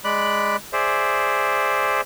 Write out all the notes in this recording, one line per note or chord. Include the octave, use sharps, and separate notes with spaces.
G#3 D5 B5 F#6
G#4 C5 D5 E5